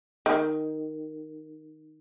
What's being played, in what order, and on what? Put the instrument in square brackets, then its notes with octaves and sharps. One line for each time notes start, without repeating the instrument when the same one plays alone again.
[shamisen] D#3